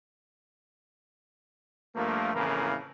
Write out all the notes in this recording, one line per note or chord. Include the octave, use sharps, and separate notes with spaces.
G2 F3 A3 A#3
F2 A2 C#3 E3 A#3 A#4